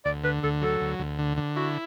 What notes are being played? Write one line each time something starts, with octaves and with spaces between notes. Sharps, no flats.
D2 D5
D3 B4
D2 A4
F#3 A4
D2
D2
D3
D3
E4 F#4